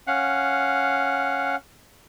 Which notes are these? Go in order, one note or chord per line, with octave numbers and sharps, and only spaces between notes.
C#4 F5 F#5